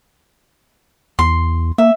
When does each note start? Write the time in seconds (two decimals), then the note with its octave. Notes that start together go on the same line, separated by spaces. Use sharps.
1.19 E2 C6
1.78 A#3 E5